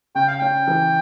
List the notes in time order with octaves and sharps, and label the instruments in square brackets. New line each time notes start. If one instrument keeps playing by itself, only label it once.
[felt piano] C#3 [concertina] G5
[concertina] F5
[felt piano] C#4 [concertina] G5
[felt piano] E3